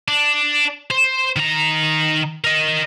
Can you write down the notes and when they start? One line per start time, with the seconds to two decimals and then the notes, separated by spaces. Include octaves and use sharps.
0.08 D4
0.91 C5
1.36 D#3 A#5
2.44 A#4 D#5